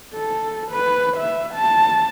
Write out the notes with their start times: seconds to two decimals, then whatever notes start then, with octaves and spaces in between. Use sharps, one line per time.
0.14 A4
0.71 B4
1.17 E5
1.54 A5